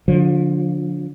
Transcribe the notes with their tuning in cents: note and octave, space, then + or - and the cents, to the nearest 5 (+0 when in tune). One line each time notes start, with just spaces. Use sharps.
D3 -20 F3 +25